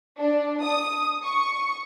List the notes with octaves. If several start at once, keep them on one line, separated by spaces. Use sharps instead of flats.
D4
D#6
C#6